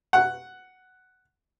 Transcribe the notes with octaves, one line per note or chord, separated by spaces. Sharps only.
F#5